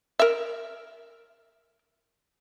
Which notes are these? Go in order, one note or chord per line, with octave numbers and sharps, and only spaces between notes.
A#4 E5